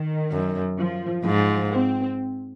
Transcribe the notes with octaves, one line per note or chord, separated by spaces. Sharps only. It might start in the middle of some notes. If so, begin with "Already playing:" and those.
Already playing: D#3
F#2
F3
G#2 F3
C4